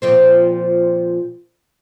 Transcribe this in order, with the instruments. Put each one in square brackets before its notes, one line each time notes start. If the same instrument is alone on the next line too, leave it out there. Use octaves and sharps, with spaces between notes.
[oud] A#2 F3 C4